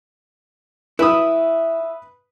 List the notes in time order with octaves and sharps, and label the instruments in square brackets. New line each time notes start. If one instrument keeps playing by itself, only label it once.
[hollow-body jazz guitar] E4 [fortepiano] B4 B5 D#6 [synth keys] E5